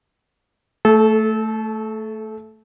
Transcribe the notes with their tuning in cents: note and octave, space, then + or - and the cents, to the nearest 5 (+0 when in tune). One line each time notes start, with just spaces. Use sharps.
A3 +10 A4 -25